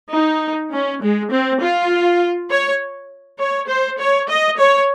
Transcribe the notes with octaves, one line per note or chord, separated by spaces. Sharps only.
D#4
C#4
G#3
C4
F4
C#5
C#5
C5
C#5
D#5
C#5